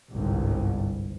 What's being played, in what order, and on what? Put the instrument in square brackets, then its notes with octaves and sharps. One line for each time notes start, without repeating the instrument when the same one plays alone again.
[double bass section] G1 C2 G#2